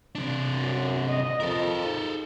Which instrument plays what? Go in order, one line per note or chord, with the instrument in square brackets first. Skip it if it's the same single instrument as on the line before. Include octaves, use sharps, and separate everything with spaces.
[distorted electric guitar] C3 D4
[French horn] F#2
D#5
[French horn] F2 [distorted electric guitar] A4 A#4
[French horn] D#4